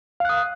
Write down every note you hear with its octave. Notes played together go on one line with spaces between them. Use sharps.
F5 D#6 F#6